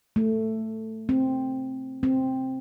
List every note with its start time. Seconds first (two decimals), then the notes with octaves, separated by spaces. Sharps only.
0.16 A3
1.09 C4
2.03 C4